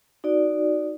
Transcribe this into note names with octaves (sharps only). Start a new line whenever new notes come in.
D#4 F#4 D5